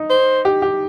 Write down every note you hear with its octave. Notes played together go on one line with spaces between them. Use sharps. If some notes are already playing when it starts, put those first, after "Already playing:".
Already playing: D#4
C5
G4
G4